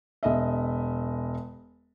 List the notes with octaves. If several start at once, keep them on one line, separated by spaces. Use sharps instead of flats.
E1 D#5 E5